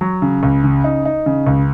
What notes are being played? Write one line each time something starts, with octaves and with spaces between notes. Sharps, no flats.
F#3
C#3
C#2
C#3
D#4
D#4
C#3
C#2